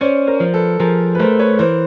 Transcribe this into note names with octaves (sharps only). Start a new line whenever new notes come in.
C#4 C5 D5
A#4 C5
F3
A4 B4
F3 G#4 A#4
B4
A3 A#4 C5
B4 C#5
E3 A#4 C5